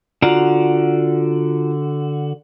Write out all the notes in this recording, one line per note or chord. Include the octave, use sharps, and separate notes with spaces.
D3 F4 F#4 D5 A#5